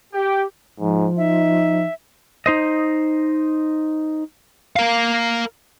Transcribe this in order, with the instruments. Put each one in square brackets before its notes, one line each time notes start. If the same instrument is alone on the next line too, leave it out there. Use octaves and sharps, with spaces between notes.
[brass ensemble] G4
[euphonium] G#2 [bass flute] F3
[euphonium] D#4 [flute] E5
[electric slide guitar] D#4 C5 D#5
[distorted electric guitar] A#4 F5